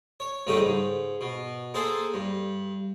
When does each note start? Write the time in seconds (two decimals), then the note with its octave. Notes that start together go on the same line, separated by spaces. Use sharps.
0.20 C#5
0.47 A1 G2 C#3 A3 D#4 G4
0.60 G#2
1.21 B2
1.74 A#3 G#4 A4 C5
2.14 G2